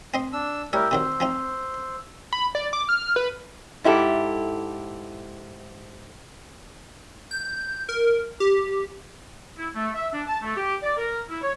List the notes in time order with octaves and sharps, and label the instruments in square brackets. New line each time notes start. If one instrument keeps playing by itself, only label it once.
[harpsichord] C4 D#5 C6
[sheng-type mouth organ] D4 E6
[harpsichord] G3 C#5 [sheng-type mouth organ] E4 G4 A#4 [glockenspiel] E6
[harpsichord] C3 D#3 F#3 [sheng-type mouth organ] C5
[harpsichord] F3 C4 D#4
[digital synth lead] B5
D5
D6
F6
B4
[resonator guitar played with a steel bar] G#2 E4 G4 A4
[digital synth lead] G6
A#4
G4
[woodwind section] E4
A3
E5
D4
A5
A3
G4
D5
A#4
E4
C#5